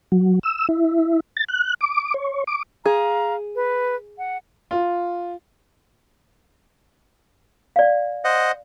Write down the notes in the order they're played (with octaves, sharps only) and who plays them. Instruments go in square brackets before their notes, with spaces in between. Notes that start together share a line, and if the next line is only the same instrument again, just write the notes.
[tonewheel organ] F#3
E6
E4
A6
F#6
D6
C#5
D6
[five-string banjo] G#4 [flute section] F5 A#5
[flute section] B4
F#5
[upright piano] F4
[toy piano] D5 F5
[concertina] C5 D#5 F#5